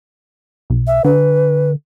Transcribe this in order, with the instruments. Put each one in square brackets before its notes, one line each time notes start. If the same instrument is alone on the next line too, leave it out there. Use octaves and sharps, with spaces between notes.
[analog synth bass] B1
[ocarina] E5
[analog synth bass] D3 [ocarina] B4